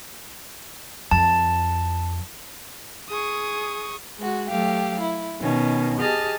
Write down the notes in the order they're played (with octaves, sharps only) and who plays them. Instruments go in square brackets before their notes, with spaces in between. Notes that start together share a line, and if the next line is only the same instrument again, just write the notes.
[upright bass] F2 [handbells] A5
[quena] G#4 [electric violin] C#6 D#6
[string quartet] G#3 F#4
F#3 A3 G4 F5
E4
B2 D#3 C#4
G4 G#4 D#5 A5 F6